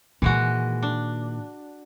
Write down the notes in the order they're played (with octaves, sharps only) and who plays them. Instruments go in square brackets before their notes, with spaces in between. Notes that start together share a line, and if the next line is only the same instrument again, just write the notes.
[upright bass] A#2 D#3 [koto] E3 G#3 F#4
[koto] D4